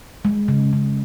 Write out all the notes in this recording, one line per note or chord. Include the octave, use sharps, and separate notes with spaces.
G#3
C#3
C#3